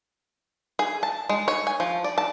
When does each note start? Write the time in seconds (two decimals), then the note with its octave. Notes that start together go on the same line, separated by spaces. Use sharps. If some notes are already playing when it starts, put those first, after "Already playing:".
0.79 G#4
1.03 A5
1.29 G#3
1.48 C#5
1.67 G#5
1.80 F3
2.04 D5
2.18 A5